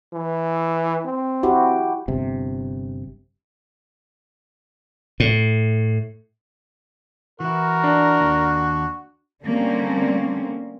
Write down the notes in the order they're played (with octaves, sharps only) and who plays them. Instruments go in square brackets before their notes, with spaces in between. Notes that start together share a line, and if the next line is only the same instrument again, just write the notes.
[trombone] E3
C4
[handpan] E4 F#4 G4
[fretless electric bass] G1 C3
[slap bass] A2
[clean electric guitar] E3 E4 [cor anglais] F#4 [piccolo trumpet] A#4
[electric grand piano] D4
[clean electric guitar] D#2
[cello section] D3 G3 A3 A#3 C4 C#4